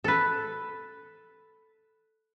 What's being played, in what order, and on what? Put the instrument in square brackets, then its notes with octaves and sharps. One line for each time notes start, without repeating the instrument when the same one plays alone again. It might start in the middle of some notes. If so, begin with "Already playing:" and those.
[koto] A4 B4